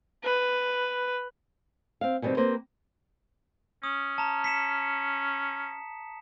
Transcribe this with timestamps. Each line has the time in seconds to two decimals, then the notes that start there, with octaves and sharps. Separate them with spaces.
0.24 B4
2.01 C4 F5
2.22 B2 D#3 G3 A3 C4
2.37 A#3 C4 G4 B4 C5
3.83 C#4 D#6
4.18 A5 A#5
4.44 B6 C#7 E7